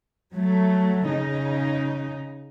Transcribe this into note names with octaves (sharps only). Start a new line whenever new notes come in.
F#3 A3
C#3 D#4